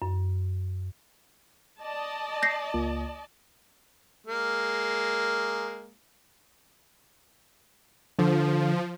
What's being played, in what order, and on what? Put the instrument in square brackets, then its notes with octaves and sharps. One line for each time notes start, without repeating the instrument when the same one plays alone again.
[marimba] F#2
[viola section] D5 D#5 A5
[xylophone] G6 A#6 C7
[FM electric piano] C#2 A#3 F4
[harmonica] G#3 A#3
[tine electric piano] D3 [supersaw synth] F3